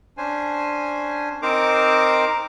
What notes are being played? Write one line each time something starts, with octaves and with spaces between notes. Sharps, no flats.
C#4 D4 C5 G#5
C4 D#4 A#4 C5 A#5 D6